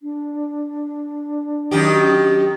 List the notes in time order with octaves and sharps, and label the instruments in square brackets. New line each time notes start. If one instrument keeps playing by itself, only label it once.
[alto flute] D4
[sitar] F#2 D#3 G4